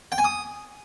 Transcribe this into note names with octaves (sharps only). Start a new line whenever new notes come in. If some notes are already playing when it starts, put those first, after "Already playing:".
G5
G#5
D#6